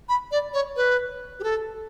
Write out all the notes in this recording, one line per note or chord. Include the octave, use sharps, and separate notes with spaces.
B5
D5
C#5
B4
G4
A4